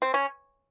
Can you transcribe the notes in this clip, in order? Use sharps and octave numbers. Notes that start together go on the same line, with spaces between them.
C4
C#4